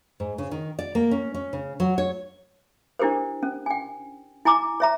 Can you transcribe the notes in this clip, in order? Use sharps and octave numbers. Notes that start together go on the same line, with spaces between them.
G#2
C#3
D#3
D5
A#3
C#4
C#4
C#3
F#3
C#5
D4 E4 G4 A#4 C5
C#4
G5 G#5
E4 G#5 A#5 D6
C#5 E5 A#5